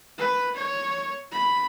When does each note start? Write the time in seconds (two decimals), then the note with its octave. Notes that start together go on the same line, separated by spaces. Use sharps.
0.18 B4
0.55 C#5
1.32 B5